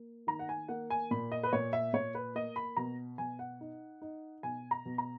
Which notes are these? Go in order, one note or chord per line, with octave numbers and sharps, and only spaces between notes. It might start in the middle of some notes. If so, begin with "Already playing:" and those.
Already playing: A#3
D#3 A#5
F#5
G#5
A#3 F#5
G#5
A#2 B5
D#5
B4
A#2 C#5
E5
A#2 C#5
B4
A#3 D#5
B5
B2 A#5
B2 G#5
F#5
D#4
D#4
B2 G#5
A#5
B2
A#5